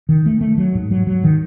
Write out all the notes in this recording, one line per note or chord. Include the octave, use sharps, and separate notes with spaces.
D#3
A3
A3
F#3
G#2
F#3
F#3
D#3